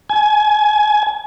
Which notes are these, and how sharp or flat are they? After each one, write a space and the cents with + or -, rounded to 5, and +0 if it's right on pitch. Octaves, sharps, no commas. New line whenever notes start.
G#5 +25